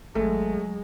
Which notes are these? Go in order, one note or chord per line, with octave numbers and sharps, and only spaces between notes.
G#1 F#3 G#3 A3